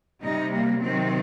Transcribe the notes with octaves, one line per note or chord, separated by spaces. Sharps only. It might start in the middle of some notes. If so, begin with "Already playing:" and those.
C3 G3 D#4
A#3
C3 D#3 F#3 C4